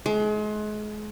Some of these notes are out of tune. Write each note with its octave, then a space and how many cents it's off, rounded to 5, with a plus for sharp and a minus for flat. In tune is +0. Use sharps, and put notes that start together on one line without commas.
G#3 +35